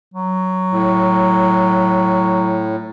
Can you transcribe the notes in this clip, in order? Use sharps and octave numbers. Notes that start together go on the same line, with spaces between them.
F#3
A2